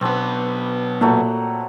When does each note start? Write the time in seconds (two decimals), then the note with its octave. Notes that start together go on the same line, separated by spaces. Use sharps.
0.01 B1 B3 C4 D4 B4
1.01 A#2 F#3 A3 F#5